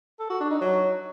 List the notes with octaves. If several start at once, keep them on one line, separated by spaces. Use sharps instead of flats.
A4
F#4
D4
D#4
F#3